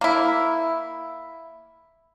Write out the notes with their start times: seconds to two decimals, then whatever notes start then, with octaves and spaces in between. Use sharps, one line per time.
0.01 A#3 E4